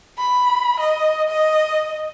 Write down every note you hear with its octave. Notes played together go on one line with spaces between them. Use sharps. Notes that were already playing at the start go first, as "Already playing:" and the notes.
B5
D#5
D#5